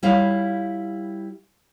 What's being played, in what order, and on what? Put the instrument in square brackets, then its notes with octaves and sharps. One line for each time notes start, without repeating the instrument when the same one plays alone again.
[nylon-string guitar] G3 E4 F4 C#5 F5